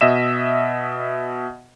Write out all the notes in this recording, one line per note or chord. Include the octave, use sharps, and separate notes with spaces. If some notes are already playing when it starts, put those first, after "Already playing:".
B2 D#5 E5 E7